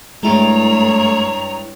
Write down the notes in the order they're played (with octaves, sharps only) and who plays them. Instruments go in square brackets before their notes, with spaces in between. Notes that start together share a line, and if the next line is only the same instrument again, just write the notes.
[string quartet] G2 C#5 [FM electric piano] G#3 E4 [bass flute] A3 [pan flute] A#5